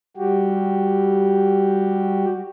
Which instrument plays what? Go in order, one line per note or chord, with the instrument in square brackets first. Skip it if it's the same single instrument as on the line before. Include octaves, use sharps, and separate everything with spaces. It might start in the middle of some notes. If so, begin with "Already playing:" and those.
[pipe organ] G3 F#4 G4